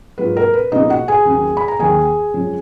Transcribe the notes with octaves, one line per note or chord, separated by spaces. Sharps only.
G#2 F#3 A#3 F4 B4
A#4
B4
C#2 B2 A#3 D#4 D#5
F#4 F#5
G#4 G#5
D#2 C#3 F#3 A#3
B5
A#5
D#2 D#3 A#3 G#4 G#5
F#2 C#3 F3 G#3 C#4